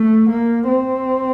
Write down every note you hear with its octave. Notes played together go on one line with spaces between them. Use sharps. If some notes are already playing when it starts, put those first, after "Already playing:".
Already playing: A3
A#3
C4